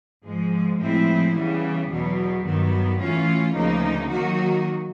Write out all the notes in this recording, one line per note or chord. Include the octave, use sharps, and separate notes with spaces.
G#2 F3 G#3
A2 F3 G#3 C4 E4
C#3 E3 G3 B3
E2 B2 F#3 B3
G2 D#3 F#3 B3
A2 E3 A3 C#4 F4
D2 C#3 F3 A#3 D#4
D#3 F#3 A#3 D#4 F#4